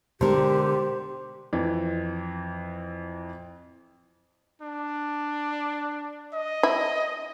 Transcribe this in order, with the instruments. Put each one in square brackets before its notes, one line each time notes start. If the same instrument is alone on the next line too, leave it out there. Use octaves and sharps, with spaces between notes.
[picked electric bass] B2 G#3 [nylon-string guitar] D3 A#4 [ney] G4 [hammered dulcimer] C5
[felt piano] F2 E3
[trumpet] D4
D#5
[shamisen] E4